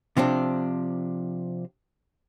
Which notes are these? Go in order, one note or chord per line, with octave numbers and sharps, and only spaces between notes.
C3 F3 C4 D4